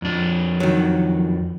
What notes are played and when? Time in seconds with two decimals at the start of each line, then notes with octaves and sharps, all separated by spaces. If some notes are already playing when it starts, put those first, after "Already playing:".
0.02 F2 D4
0.60 D#3 F#3